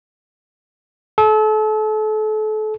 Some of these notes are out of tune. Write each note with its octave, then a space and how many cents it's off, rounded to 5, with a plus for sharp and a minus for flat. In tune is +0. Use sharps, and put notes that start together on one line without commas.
A4 -35